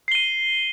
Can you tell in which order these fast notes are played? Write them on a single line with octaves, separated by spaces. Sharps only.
C7 G7 D#7